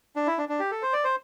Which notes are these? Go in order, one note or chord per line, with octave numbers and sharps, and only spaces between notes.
D4
E4
D4
D4
G4
A4
C5
D5
C5